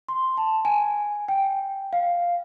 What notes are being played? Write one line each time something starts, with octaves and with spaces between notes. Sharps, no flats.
C6
A5
G#5
G5
F5